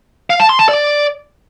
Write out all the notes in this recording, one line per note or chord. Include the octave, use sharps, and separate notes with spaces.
F5
A5
C6
A5
D5